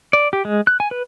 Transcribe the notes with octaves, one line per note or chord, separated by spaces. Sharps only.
D5
G4
G#3
F#6
G#5
B4